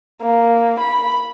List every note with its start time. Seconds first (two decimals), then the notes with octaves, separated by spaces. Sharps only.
0.22 A#3
0.80 B5